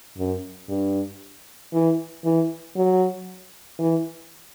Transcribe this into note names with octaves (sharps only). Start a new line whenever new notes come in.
F#2
G2
E3
E3
F#3
E3